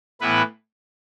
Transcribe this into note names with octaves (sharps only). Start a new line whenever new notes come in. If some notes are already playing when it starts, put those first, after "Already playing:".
A2 E3 B3 E4 B4